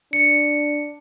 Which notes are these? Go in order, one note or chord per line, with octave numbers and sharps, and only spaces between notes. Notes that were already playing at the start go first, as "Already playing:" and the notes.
D4 C#7